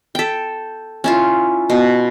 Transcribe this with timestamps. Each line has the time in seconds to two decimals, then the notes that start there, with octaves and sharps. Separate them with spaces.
0.15 A4 G5
1.04 C#4 E4 F4
1.70 B2